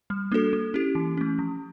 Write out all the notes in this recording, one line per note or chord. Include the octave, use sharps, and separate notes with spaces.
G3
A#3 D4 F#4 A4
A#3
C#4 E4 G4
E3
A3 C#4
F3